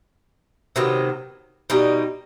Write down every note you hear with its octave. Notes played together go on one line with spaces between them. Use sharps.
C3 D#3 F#3 B3
B2 G3 D#4